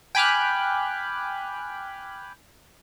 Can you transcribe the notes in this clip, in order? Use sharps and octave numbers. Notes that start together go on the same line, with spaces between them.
G5 G#5 B5 D6 F6 F#6